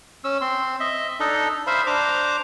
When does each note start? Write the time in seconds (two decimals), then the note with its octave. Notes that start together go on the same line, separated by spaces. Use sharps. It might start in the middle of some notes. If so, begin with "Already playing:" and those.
0.24 C#4 E6
0.41 C4 C6
0.80 D#5 E5
1.20 D4 D#4 A4 D#5
1.67 C5 E5 F5 B5
1.87 D4 C5 A#5 D6